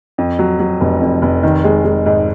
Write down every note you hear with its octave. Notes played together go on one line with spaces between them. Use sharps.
F2
F#3
F#3
F1
F2
F1
D#3
G#3
G#3
G#2